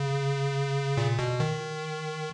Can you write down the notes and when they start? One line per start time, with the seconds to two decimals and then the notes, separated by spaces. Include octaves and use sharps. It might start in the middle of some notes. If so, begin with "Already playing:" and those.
Already playing: C#3
0.97 A#2
1.19 B2
1.40 D#3